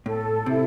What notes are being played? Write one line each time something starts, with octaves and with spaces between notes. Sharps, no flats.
A2 A4
C3 E4